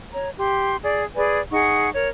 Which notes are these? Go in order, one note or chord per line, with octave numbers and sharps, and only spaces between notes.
C#5 A#5
G4 C6
G#4 D5
G#4 B4 D5 G#5
D#4 G#4 F#5 C#6
A#4 C#5